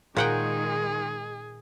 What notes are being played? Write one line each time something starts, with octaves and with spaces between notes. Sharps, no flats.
A#2 D#3 G#3 G#4 F#5 G5